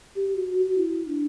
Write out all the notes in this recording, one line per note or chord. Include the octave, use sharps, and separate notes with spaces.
G4
F#4
F#4
E4
D4